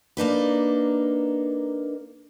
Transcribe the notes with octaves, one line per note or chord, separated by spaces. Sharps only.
A#3 D4 D#4 B4